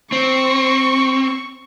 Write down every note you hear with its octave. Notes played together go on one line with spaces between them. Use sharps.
C4 C#6